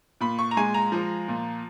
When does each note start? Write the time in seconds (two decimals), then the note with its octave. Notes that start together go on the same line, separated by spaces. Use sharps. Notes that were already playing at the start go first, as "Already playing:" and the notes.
0.21 A#2 B5
0.39 C#6
0.51 A#5
0.57 G#3 G#5
0.74 A#5
0.92 F3
1.28 A#2